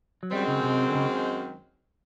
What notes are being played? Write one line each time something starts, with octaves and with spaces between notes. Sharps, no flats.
F#3
F#2 D#3 G3 G#3 C4
C#3
C3
D3
C#3